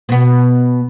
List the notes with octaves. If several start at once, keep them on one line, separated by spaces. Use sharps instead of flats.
B2 B3